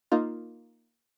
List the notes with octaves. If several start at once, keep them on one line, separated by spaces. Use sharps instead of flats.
A#3 D#4 F4